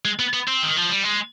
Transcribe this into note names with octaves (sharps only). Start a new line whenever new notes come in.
G#3
B3
B3
C4
D#3
F3
G3
G#3